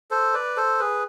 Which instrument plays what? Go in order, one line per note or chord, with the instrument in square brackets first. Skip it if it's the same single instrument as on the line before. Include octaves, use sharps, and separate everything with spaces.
[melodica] A4 C5
B4 D5
A4 C5
G#4 B4